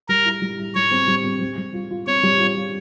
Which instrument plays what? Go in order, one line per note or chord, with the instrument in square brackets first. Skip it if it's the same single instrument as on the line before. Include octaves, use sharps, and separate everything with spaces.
[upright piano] G3 [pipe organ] A#4
[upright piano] E4
G3
E4
[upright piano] G3 [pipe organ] C#5
[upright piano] C4
G3
C4
G3
G3
F4
F4
[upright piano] C4 [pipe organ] C#5
[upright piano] G3
F4
F4